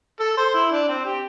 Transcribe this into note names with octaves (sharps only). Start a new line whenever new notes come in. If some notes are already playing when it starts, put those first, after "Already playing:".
A4
C5
E4
D4
C4
G4